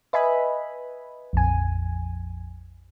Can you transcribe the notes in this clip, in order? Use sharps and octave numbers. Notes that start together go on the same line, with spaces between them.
B4 D#5 E5 G#5 B5
A#1 F2 G#5